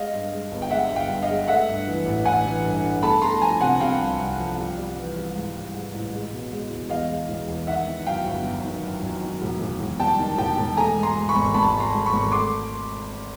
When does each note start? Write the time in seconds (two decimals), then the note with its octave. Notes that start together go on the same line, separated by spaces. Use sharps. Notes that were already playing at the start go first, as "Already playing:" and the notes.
Already playing: G#3 D#5 F5
0.13 G2
0.32 G#3
0.52 G1
0.62 G5
0.70 G#3 E5 F#5
0.91 G1
0.96 F5 G5
1.09 G2
1.22 D#5 F5
1.29 G#3
1.48 A3 E5 F#5
1.68 G2
1.87 E3
2.06 A1
2.25 A1 F#5 G#5
2.44 E3
2.65 G2
2.83 G2
3.03 A3 A5 B5
3.22 A3 A#5 C6
3.42 F3 G#5 A#5
3.61 C3 F#5 G#5
3.80 C3 F5 G5
4.00 C2
4.19 C2
4.38 F3
4.58 G3
4.77 G3
4.97 E3
5.16 G3
5.35 G#2
5.55 G3
5.74 G#2
5.93 A1
6.13 G#3
6.32 B2
6.52 G#3
6.71 E1
6.90 E2 D#5 F5
7.09 G#3
7.29 E1
7.48 E2
7.67 D#3 E5 F#5
7.86 D#3
8.06 F#2 F5 G5
8.25 G1
8.45 F#2
8.65 D#3
8.84 F#2
9.03 F#2
9.23 D#3
9.42 E1
9.61 E1
9.80 E1
9.99 G3 G5 A5
10.19 D#3
10.38 E1 G5 A5
10.57 E1
10.77 A3 G#5 A#5
10.96 G#2
11.03 A#5 C6
11.16 G#2
11.29 B5 C#6
11.35 G#1
11.54 G#1 A5 B5
11.73 G#2
11.80 A#5 C6
11.93 G#2
12.06 B5 C#6
12.13 G#1
12.32 A3 C6 D6